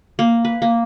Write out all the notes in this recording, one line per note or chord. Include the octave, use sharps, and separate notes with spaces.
A#3
B4
A#3